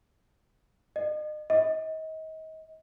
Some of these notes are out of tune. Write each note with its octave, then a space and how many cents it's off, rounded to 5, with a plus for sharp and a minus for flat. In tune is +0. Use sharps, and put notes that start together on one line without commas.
D#5 -40
D#5 +35